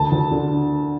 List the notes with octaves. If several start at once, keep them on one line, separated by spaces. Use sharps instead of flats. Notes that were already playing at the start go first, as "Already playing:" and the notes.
Already playing: D2 A5
D2
D3